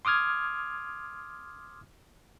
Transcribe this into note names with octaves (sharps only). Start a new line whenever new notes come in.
C6 D6 D#6 F6 G#6